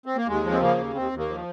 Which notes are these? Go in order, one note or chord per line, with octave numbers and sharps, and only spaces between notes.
C4
A#3
D#2 G#3
F3
C4
C#3 A#3
D#2
D#2 C4
D#2
A#3
F3